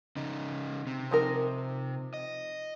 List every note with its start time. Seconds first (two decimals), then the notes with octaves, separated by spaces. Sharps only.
0.16 C#3 D#4
0.87 C3
1.11 F3 D#4 A#4
2.14 D#5